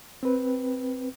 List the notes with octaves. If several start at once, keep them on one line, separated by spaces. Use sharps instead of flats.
C4 B4